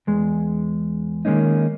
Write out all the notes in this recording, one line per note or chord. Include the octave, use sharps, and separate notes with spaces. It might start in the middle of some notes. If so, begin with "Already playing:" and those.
E2 G#3
D#3 G#3 A#3 C#4 D#4